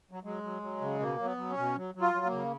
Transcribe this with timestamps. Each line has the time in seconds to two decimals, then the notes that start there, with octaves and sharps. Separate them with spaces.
0.11 F#3
0.24 F#3 G#3
0.43 F#3
0.62 F#3
0.81 C#3
0.99 B2 A#3
1.19 F#3
1.25 B3
1.37 F#3
1.50 C#4
1.57 B2
1.76 F#3
1.95 F#3
2.01 F4
2.14 F#3
2.26 A#3
2.32 C#3